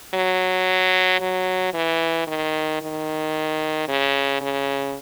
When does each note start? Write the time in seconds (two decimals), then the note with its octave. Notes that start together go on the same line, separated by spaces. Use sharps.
0.14 F#3
1.21 F#3
1.74 E3
2.27 D#3
2.81 D#3
3.88 C#3
4.41 C#3